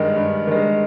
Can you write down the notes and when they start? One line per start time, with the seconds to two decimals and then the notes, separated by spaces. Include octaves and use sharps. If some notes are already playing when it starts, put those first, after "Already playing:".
Already playing: G2 D#3 G#3
0.16 G2
0.47 D#3 G#3